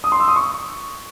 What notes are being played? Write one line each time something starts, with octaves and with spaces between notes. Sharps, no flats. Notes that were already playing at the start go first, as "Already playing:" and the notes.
D#6
C6
E6
D#6
C#6